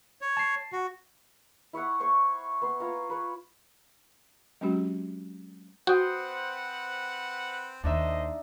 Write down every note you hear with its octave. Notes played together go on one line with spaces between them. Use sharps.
C#5
A5 C7
F#4
E4 C#5 E5 F#5
C5 C#5 C#6
B3 C6
F4 C#5 A#5
B4 C#5
F#3 G#3 C4 C#4 F#4 G4
C4 F#4 B4 C5 F#5 G5 D#6
D#2 D4 D#4 C5 D#5 E5